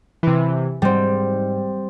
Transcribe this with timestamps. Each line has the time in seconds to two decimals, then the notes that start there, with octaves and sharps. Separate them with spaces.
0.23 C3 E3
0.82 G#2 G3 C4